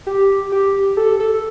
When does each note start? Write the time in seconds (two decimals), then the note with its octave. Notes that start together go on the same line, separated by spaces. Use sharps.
0.07 G4
0.52 G4
0.97 A4
1.20 A4